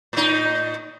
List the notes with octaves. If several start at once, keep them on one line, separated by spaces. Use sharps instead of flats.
A2 D#4